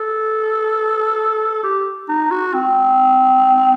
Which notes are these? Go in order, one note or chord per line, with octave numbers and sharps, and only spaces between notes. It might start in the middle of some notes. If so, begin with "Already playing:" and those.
Already playing: A4
G4
D#4
F#4
C4